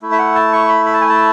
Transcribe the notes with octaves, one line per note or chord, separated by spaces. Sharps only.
A3 E4
E5
F#5
A5
C#6
B5
B5
A5
G#5
A5